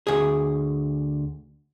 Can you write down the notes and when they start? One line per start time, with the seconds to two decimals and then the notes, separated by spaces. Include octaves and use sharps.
0.07 D2 G#4